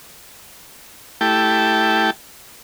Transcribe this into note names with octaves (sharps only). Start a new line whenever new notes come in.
A3 E4 G4 G5 A5